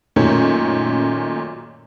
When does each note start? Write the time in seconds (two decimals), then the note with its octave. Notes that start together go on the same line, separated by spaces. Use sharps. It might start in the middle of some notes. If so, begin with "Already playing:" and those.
0.16 F#2 A#2 D#3 A3 C#4